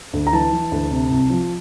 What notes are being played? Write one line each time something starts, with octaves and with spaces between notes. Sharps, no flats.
D2
A#5
E3 A5
E3
D2
C3
C2
F3